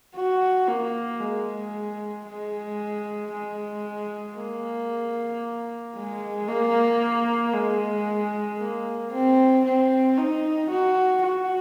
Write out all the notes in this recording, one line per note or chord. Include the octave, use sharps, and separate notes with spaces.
F#4
A#3
G#3
G#3
G#3
A#3
G#3
A#3
G#3
A#3
C4
C4
D#4
F#4
F#4